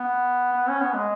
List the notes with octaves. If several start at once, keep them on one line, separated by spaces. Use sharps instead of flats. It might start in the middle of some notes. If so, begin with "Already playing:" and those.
Already playing: B3
B3
C#4
B3
G#3